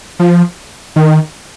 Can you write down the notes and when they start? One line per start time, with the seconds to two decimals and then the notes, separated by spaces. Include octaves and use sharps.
0.19 F3
0.96 D#3